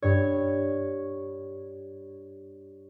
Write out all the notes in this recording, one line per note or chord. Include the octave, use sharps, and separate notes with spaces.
G2 C#5